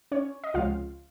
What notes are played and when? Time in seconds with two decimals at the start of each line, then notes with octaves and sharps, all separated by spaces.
0.11 C#4 C#5
0.44 D#5
0.54 C#2 C3 F3 G#3 C#4 F4 F5